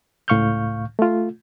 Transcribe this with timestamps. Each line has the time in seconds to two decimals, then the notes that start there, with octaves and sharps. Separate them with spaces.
0.28 C#2 A2 F5 C#6 F6 G6
0.99 A3 F4